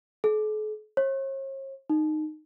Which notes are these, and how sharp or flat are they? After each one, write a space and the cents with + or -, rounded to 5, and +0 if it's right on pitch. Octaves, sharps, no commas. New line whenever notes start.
A4 -45
C#5 -45
D#4 -15